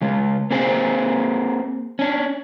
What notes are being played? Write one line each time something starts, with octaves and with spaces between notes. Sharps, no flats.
C#3 G#3
A#3 C4 G#4 C5
C#4 D4